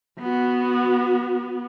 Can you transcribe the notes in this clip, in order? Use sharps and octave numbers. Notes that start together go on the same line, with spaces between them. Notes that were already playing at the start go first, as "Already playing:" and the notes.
B3 F#4